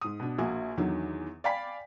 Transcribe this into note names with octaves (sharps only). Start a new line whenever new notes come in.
G#2 D#6
B2 D4
A#1 A#3 F#4 G#5
E2 D3 D#3 F#3
D5 F5 G5 G#5 B5 B6